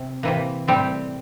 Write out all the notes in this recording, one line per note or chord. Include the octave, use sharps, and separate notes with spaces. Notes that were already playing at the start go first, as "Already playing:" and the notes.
Already playing: C3
C3 E3 A#3
A2 G3 C4